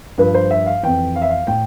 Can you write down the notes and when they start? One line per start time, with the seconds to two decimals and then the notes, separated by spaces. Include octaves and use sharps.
0.18 G2 F3 B4
0.34 C5
0.51 E5
0.66 F5
0.83 F2 E3 G5
1.16 F5
1.22 E5
1.29 F5
1.47 A2 G5